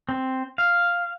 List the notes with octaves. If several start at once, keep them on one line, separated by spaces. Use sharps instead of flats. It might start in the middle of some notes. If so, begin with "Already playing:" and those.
C4
F5